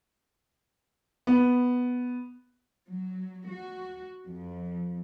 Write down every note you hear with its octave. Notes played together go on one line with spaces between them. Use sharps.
B3
F#3
F#4
F2